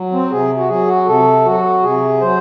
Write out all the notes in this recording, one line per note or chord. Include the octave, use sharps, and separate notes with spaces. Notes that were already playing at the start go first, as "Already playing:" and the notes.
Already playing: F#3
C4
C3 G#4
F#4
F#3 G#4
F#4
C3 A4
F#3 F#4
C3 G#4
F#3 C5